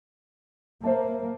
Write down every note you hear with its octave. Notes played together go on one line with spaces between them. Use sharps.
A#3 C5 E5 A5